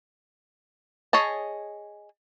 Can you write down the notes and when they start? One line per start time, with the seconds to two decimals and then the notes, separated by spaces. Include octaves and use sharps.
1.13 G#4 C#5 D#5 A5